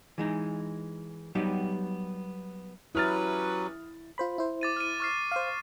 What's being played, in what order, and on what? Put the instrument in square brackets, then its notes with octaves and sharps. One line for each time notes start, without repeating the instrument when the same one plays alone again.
[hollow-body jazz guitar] E3 G#3 D#4
F#3 G3 B3 D#4 G4
[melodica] F#3 [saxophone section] C#4 G4 B4 [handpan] E4 [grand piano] D#6 F6 A6
[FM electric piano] F4 C5 B5
E4 C5
[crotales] D6 A6 D#7
F6 D#7
C#6 F6 C7
[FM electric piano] C5 F5